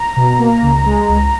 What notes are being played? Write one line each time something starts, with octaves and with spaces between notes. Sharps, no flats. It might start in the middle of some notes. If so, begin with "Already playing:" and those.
Already playing: A#5
B2
A#3
C#2
G#3
C#2